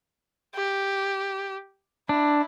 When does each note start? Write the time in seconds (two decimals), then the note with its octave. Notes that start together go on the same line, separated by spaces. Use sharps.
0.54 G4
2.09 D4 E4